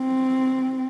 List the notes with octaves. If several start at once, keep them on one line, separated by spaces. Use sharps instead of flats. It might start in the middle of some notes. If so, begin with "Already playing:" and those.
Already playing: C4